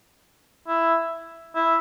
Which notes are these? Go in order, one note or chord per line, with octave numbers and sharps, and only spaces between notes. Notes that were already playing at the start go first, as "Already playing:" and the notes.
E4
E4